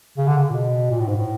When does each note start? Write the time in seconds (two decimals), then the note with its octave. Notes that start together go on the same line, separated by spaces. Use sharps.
0.18 C#3
0.27 D3
0.38 C#3
0.50 A#2
0.54 B2
0.91 A#2
1.00 A2
1.08 G#2
1.17 A2